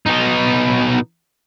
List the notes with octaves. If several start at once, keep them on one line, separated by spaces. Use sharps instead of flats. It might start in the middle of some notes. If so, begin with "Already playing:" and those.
B2 D#4